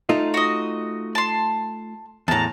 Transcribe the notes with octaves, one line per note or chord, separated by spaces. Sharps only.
A3 D#4 F4
F#4 D#5
A5 C6
E2 A2 A5 A#5